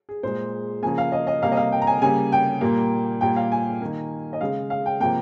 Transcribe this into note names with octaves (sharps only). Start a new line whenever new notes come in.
G#4
A#2 G#3 C5
C#3 F3 A#3 G#5
F5
D#5
D#5
C3 G3 A#3 F5
D#5
F5
G5
A#5
G#5
C#3 G3 A#3 G#5
G5
A#2 G3 A#3
A#2 G3 A#3 G5
F5
G#5
D#3 A#3
D#5
C#3 G#3 F5
F5
G5
C3 F3 A#3 G5